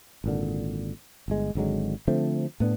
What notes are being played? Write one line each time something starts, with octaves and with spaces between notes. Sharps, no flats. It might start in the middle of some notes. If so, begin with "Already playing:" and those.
G#1 A#2 D3
G1 G#3
G#1 D3 F#3 G#3
D3 F3 A3 C4
A2 B3 D4